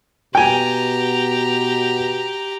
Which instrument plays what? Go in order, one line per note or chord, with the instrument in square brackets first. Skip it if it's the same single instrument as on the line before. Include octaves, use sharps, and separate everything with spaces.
[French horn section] B2 F#4 [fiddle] G4 A#5 [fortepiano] G5 G#5